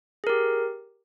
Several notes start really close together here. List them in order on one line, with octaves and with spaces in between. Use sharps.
G#4 A#4 G4